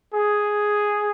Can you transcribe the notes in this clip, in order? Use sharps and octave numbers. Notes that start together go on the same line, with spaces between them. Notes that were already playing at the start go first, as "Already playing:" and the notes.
G#4